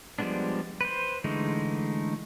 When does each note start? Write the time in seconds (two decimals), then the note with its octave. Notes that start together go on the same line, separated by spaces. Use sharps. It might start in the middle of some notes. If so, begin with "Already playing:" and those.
0.19 F3 G3 G#3 B3 D4
0.81 B4 C5
1.24 D3 E3 G#3 A3 D#4